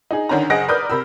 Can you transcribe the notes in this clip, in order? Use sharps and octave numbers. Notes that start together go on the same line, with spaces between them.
D#4 G#4
D3 D#3 C#4 A#5
F#1 G#4 D#5 F#5 A#6 D7
A#4 B4 D5 D#6 F6 G6
C3 A#4 B5 E6